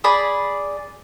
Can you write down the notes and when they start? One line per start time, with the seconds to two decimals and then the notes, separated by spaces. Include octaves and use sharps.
0.04 G#4 D5 B5